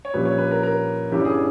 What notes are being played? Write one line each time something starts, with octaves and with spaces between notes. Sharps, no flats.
C#5
A#1 A#2 G3 C#4 B4
C#5
B4
A#4
A#4
G1 G2 E3 G3 C#4 G4
G#4